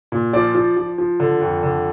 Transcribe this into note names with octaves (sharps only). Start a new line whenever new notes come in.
A#2
F3 D5
F3
F3
F3
D3
F2
D3